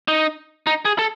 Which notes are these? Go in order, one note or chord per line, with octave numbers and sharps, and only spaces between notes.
D#4
D#4
G#4
A4